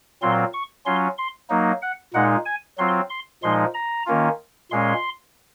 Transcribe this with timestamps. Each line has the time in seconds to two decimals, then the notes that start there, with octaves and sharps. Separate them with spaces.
0.22 A#2 F#3 C4 F4 C6
0.53 C#6
0.86 F#3 C#4 F4 C6
1.18 C6
1.50 F#3 A#3 D#4
1.82 F#5
2.13 A#2 G#3 D#4 F#5
2.46 G#5
2.78 F#3 C4 F4 C6
3.10 C6
3.43 A#2 F3 G#3 D#4 C6
3.74 A#5
4.06 D#3 A#3 C#4 F4
4.71 A#2 G#3 C#4 C6